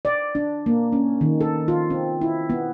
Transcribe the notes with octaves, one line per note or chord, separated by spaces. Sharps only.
D5
D4
A#3
C#4
D#3
A4
F4
C4
E4
B3